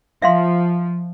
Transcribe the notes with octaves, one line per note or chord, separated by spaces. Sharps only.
F3 E5 F5 C6